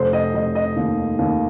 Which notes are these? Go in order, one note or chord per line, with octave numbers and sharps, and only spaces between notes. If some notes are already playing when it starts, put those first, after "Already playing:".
Already playing: F1 C5
D#5
F1 D#5
D#5
D#2
D#2